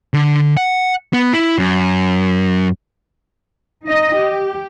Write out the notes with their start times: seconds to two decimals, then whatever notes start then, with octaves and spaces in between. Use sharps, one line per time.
0.14 D3
0.57 F#5
1.13 B3
1.33 E4
1.59 F#2
3.86 D#4 D#5
4.16 G4